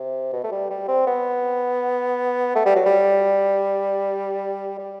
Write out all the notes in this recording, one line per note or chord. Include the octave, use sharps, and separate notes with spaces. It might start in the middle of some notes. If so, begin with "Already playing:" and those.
Already playing: C3
B2
A3
G3
G3
C4
B3
A3
G3
F#3
G3
G3